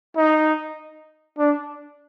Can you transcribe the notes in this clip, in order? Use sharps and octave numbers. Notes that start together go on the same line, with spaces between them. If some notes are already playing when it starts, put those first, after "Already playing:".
D#4
D4